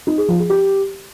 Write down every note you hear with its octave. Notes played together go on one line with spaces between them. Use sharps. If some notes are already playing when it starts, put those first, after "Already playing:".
D#4
G#4
F3
G#4
G4